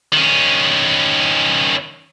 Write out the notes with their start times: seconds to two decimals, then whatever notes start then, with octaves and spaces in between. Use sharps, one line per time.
0.13 D#3 C#4